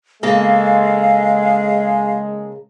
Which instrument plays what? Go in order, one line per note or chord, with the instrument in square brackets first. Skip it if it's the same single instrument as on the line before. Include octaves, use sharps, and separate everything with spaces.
[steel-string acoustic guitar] C#3 A#3 A4 [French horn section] G#3 [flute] F5